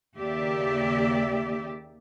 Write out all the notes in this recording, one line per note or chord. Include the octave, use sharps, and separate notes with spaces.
D#2 C#3 A#3 G4 D5 E5